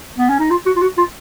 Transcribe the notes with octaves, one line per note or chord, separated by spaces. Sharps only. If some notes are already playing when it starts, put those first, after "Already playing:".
B3
C#4
D#4
F4
F#4
F4
F#4
F4